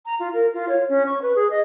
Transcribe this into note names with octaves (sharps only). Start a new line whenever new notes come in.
A#5
F4
A#4
F4
C#5
C#4
C#6
B4
G#4
D#5